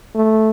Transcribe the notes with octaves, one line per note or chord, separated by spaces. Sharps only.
A3